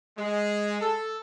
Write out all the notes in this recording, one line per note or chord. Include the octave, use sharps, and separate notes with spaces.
G#3
A4